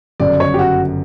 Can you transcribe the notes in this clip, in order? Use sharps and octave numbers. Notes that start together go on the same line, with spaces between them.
G1 F#2 C#3 D5
C#5
G4
F#4